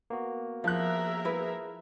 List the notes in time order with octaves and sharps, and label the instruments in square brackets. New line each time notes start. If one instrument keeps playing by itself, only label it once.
[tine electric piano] A#3 B3 F#4
[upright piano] F3 F#6 [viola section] G#4 A#4 E5 [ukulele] F5
[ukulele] E4 B4